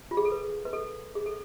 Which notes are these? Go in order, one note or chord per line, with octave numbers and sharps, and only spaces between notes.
F4
G#4
A4
B4
B4
A4
G#4
A4